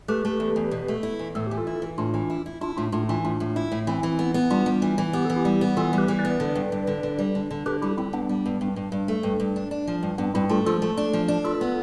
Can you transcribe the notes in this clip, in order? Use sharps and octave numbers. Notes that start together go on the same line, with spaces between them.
A3 G4 B4
A3
E2
E2
B2
A3
E4
E2
A2 A4
E3 G4
F4 A4
E4
E3
A2 D4 F4
E3
E4
E4
D4 E4 F4
A2 D4 F4
A2 D4 F4
E3 D4 F4
A2 D4 F4
A2
E4
A2
E3 C4 E4
E3
B3
B3
G3 D4 F4
G3
E3
E3
B3 G4
E3 A4
E4 G4
G3
B3
E3 F4 A4
G3
G4 B4
E3
B4 D5
B3
D3
G2
G2
D3
D3
G3
D3
D3
D3 G4 B4
G3 E4 G4
G3 C4 E4
G2 B3 D4
G3
G2
G2
G2
G2
A3
G2
G2
D4
D4
F3
G2
G2 B3 D4
G2 C4 E4
A3 D4 F4
F3 F4 A4
A3
D4
F3
D4
F4 A4 B4
B3